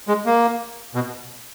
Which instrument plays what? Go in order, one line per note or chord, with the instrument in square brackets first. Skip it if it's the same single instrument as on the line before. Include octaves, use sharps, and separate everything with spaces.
[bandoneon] G#3
A#3
B2